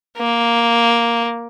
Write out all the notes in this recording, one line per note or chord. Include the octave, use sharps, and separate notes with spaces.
A#3